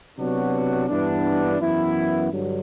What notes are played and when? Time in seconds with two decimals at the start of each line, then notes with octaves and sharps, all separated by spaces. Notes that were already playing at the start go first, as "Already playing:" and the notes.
0.18 C3 F#3 B3 D4 F#4
0.89 G2 E3 B3 D4
1.60 F#2 E3 B3 E4
2.30 G2 D3 F#3